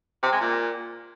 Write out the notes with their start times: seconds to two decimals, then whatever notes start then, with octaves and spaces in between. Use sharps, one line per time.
0.23 C3
0.32 G#3
0.41 A#2